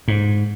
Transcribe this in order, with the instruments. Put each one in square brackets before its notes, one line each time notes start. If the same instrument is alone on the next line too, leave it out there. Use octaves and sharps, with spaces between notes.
[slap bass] G#2